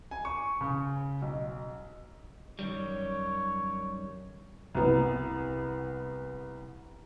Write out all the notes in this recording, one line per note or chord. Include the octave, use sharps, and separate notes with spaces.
G#5
C#6
C#3
B1
F#2 D#3 G3 C#5
C2 B3